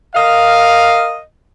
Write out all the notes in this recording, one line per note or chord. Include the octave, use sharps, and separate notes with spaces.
A#4 D#5 F5